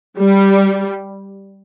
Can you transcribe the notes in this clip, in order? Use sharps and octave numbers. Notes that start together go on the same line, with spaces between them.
G3